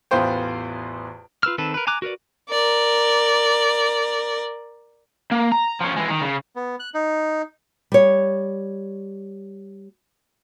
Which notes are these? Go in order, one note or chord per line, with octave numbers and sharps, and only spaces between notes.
A1 E2 B3 F4 C5 G5
F4 B4 E6 F6
D#3 C4 A4 B4
A#4 B4
G#5 A#5 D6 F#6
F#4 A#4 B4 D5
A#4 D5
A#3
A#5
F3 C#4
E3 G#3
D#3
C#3
B3
F#6
D#4
G3 C#5